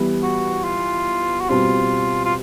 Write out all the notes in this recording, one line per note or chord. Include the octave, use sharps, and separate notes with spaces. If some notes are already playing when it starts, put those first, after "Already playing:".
Already playing: E3 G3 B3 E4
F#4
F4
F#4
B2 G3 C4 F4
F4